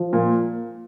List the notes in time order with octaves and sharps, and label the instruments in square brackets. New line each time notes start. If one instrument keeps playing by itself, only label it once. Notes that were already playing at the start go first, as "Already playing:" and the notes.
Already playing: [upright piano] F3
A#2